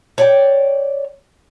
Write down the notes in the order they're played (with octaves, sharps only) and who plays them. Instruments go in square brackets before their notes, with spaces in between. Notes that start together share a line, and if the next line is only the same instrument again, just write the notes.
[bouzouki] C#5 D5 G5